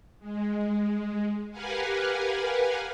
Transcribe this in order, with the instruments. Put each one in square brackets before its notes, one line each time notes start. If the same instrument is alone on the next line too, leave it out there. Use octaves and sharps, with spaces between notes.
[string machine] G#3
G4 A#4 B4 F5 F#5 G#5